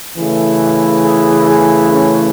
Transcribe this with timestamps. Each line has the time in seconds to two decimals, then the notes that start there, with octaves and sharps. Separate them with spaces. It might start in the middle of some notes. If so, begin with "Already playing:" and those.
0.15 C#3 E3 A3
1.04 G#4
1.49 G#4
1.94 C#4